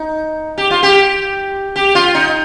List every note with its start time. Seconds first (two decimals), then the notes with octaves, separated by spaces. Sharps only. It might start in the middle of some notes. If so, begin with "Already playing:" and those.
Already playing: D#4
0.58 G4
0.71 F4
0.83 G4
1.76 G4
1.95 F4
2.15 D#4